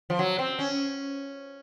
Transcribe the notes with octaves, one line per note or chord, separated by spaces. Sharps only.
F3
F#3
C4
C#4